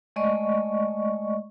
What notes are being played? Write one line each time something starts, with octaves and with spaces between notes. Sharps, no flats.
G#3 A3 D5 D#5 C#6